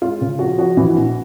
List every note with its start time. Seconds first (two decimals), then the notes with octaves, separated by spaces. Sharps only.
0.01 G#3 F4
0.21 C#3
0.39 F3 F#4
0.58 F3 F#4
0.77 E3
0.95 A#1